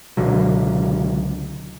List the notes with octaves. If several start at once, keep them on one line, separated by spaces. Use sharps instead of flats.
C#2 B2 D3 F#3